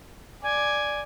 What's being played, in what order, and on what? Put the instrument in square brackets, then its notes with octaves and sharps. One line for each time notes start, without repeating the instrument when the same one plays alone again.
[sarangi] D5 [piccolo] G#5